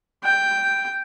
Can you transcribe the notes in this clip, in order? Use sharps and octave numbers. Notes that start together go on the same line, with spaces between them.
G5